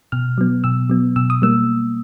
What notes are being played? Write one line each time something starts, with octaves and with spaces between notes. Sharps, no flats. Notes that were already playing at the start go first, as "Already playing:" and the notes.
B2 F6
F#3 B3
B2 E6
F#3 B3
B2 E6
D#6
G3 A#3 E6